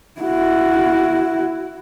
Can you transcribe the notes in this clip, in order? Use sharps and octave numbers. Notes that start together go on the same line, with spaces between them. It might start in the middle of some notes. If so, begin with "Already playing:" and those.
E4 F#4